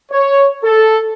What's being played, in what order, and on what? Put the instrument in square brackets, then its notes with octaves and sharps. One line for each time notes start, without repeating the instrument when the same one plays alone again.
[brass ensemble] C#5
A4